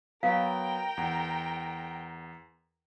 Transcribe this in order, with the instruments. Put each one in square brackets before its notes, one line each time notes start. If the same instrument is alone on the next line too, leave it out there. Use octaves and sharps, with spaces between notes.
[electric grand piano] F#3 B3 [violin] A#4 G5 [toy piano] F5
[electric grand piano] E2 F#5